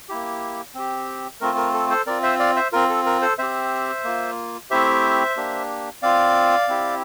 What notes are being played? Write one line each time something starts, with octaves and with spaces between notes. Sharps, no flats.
A#3 E4 G4
C4 G4
A3 C4 F4 A#4
A#4
A4
A4 C5
C4 F4 A#4 D5
C5 E5
D5 F5
C5 E5
C4 F4 A#4
A4
A#4
A4 C5
C4 G4 C5 E5
A#3 F4
A3 C4 E4 G4 C5 E5
A#3 D4 G4
C4 F4 D5 F5
C4 E4 G4